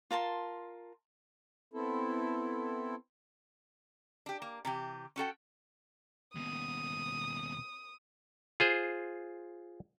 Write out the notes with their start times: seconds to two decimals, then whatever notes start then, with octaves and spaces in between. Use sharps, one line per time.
0.11 F4 A#4 A5 C6
1.74 B3 C4 E4 A4
4.26 D4 G4
4.42 A#3
4.65 C3 E3 G4
5.16 C#4 F#4 A4 G5
6.36 D#2 B2 D#6
8.60 F4 G#4 C5